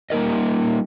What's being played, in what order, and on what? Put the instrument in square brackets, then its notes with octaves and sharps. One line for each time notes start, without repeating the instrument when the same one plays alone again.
[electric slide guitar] G3 A#3 D#4 A#4 D#5